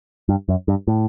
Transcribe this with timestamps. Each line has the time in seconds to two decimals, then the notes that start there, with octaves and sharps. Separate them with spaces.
0.29 G2
0.49 F#2
0.68 G2
0.88 A2